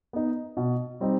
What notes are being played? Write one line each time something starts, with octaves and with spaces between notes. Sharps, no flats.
B3 D#4
B2
G3 C4 D#4